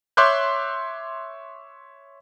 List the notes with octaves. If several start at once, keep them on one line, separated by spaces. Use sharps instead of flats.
C#5 E5 C6 D6 F#6 G6